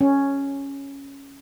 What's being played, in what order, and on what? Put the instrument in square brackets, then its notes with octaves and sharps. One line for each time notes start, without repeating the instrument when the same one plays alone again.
[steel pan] C#4